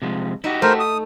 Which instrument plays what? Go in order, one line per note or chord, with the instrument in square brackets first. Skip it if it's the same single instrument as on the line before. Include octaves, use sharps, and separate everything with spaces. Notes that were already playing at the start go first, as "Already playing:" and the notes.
[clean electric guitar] C3 F3 G#3
[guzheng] D#4 [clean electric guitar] E4 F#4 G4
[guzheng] A3 [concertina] A#4 C5
[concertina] D#6